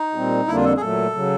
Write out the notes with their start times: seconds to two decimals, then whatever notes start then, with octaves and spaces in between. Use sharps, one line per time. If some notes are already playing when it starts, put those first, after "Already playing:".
Already playing: D#4
0.14 A#2 G3 C4
0.48 F2 D3 G3 A#3 D4 E4
0.56 F4
0.65 A4
0.77 G#4
0.80 A#2 F#3 A3 A4
1.13 C#3 F#3